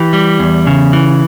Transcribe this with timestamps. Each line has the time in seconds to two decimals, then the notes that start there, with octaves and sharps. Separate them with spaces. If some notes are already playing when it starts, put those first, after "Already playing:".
Already playing: E3 G4
0.13 G3
0.39 E2
0.67 C#3
0.93 E3